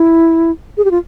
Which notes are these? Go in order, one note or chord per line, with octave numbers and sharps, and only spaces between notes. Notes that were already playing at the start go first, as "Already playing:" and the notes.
Already playing: E4
G#4
G4
F4